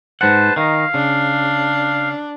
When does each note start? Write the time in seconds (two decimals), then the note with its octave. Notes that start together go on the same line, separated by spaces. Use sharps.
0.21 G#2 B4 C5 F#5 A5
0.56 D#3 D#4 F5
0.94 C#3 D4